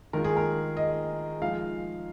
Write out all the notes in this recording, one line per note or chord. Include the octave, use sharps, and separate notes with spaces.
D#3 G#3 F4 A#4
G#4
A#4
D#5
F3 G#3 D#4 F5